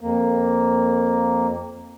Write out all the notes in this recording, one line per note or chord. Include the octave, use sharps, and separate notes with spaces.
F2 A#3